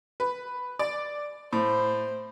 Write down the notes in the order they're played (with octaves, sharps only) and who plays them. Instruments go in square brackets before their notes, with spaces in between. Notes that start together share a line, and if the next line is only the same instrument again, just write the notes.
[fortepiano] B4
D5
[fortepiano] A2 [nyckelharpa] C5